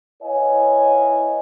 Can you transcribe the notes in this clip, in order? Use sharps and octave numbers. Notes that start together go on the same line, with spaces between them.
E4 B4 C#5 D#5 F5 G#5